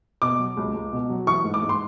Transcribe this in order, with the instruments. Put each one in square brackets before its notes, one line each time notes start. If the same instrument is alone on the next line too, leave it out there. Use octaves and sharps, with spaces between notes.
[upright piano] B2 D6
F#3
C#2
C#2
B2
F#3
E3 C#6
G#2
D6
G#2
C6